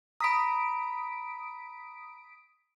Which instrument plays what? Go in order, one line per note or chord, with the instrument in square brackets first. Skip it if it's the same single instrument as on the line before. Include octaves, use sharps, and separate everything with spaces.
[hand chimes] A#5 B5 [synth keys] D#6 B6 D7